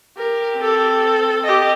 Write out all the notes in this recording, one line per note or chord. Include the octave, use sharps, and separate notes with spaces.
G4 A#4
C4 A4
G4 D#5